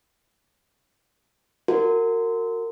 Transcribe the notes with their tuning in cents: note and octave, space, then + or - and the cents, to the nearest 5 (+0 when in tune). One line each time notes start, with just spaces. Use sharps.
F#4 -15 A#4 -30